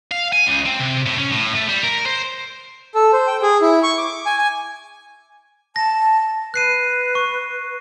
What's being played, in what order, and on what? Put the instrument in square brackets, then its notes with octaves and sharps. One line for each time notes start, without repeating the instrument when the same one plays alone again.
[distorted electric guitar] F5
G#5
C#2
C4
C3
A2
C#4
A2
A3
G3
A#4
C5
[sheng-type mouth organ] A4
C5
G5
G#4
E4
C#6
D6
G#5
G#5
[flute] A5 [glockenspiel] A#6
[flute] B4 [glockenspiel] F#6 C7 D#7
[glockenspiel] C#6